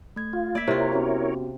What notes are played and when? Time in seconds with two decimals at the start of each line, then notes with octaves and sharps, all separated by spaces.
0.16 A3 G#6
0.33 F4
0.55 A#3 D5 E5 G#6 B6
0.68 C3 E4 F4 A#4 C#5
0.92 B3 C#4 F#4